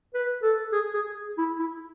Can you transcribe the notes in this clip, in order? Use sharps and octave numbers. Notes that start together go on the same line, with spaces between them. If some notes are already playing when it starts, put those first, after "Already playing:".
B4
A4
G#4
G#4
E4
E4